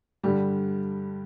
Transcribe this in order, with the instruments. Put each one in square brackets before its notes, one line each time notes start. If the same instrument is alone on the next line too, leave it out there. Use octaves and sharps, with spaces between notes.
[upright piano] G2 D3 G3 G4